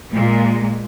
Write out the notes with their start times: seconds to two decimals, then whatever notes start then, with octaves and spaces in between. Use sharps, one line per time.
0.13 A#2 G#3